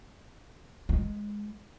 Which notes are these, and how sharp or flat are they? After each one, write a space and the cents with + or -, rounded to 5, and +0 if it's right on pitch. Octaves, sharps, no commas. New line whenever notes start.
G#3 -5